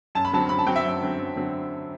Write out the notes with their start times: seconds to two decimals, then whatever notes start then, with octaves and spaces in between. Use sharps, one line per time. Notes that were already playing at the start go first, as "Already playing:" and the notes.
0.15 F#2 A5
0.25 B5
0.32 D3 F#3 C4 A5
0.49 F#2 B5
0.59 A5
0.67 D3 F#3 C4 G5
0.76 E5
0.85 F#2
1.01 D3 F#3 C4
1.19 F#2
1.36 D3 F#3 C4